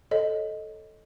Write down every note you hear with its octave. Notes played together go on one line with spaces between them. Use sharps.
A4 C#5 D#5